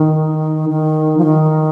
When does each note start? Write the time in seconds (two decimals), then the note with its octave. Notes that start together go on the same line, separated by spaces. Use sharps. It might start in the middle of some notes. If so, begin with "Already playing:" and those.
Already playing: D#3
0.69 D#3
1.18 F3
1.24 D#3